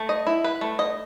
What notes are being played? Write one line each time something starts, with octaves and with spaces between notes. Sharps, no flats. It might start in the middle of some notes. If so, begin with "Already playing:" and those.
Already playing: A3
D#5
E4
B4
A3
D#5